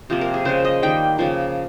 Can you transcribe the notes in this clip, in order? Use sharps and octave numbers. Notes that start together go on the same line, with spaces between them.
C3 F3 A#3
A#4
G#4
C#3 G#3 C5
D#5
D#3 G3 A#3 G5
C#3 F3 A#3